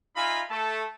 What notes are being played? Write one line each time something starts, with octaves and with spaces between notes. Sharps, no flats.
D#4 F4 E5 F5 G#5 B5
A3 A4 A5